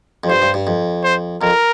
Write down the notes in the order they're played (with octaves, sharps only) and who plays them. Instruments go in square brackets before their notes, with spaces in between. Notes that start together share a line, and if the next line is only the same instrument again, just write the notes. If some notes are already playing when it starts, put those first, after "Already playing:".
[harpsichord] F2
[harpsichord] G2 [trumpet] C5
[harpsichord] G2
G2
F2
[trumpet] C5
[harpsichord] F2 [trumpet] A#4